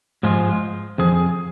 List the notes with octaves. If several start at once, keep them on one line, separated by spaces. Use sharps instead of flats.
G#2 F3 G#3 F4
F2 F3 G#4